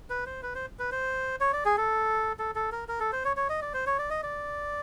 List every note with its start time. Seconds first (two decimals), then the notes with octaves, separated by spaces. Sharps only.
0.10 B4
0.26 C5
0.43 B4
0.55 C5
0.79 B4
0.92 C5
1.41 C#5
1.53 D5
1.65 G#4
1.77 A4
2.39 A4
2.55 A4
2.72 A#4
2.88 A#4
3.00 A4
3.13 C5
3.25 C#5
3.37 C#5
3.49 D#5
3.62 D5
3.74 C5
3.86 C#5
3.99 D5
4.10 D#5
4.23 D5